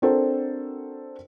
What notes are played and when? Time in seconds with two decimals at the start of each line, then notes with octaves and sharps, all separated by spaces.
0.02 C4 D4 F#4 A4 A#4 C5